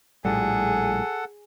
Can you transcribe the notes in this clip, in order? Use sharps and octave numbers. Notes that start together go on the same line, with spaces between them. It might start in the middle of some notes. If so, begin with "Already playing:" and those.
A#1 A2 G3 G#4 A4 F#5